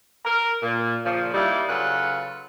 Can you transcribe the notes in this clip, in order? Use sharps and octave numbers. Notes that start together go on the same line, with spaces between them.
A#4
A#2
A#2 C#3 F3
G3 A#3 D#4 E4
C#3 F#3 F4 A4 B4